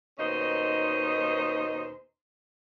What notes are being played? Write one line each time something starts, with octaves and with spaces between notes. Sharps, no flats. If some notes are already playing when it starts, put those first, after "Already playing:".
D#2 B2 C#4 D#4 C5 D#5